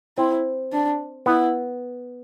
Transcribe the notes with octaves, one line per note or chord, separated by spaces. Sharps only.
C4 E4
D4
B3 E4